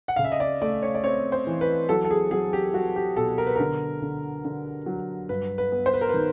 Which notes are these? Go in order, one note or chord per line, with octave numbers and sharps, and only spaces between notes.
F#5
C#3 F5
E5
D#5
D5
A3 D5
C#5
D5
C4 C#5
C5
E3
B4
F#3 A4
A4
G#4
F#3 G#4
G4
F#3 F#4
G4
B2 A4
A#4
B4
D3 A#4
D3
D3
F#3
G2 B4
B4
B3
C5
B4
A#4
D#3 B4